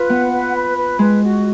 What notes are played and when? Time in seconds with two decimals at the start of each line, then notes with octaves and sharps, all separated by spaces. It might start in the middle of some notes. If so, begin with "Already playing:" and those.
Already playing: F4 B4
0.10 B3 F#5
0.31 B4
0.55 B5
0.77 B4
0.99 G#3 B4
1.22 F#4